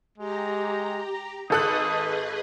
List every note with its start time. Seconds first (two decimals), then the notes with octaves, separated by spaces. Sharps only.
0.18 G#3 G4 A#5
1.50 G#1 G#4 A4 B4 D#5 D#6 F#6